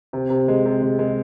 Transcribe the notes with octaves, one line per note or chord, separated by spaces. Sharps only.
C3
C3
G#3
C3
G#3
G#3